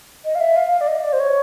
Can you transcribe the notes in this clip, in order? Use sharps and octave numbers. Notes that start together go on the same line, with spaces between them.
D#5
F5
E5
F5
F5
D5
D#5
D5
C5
C#5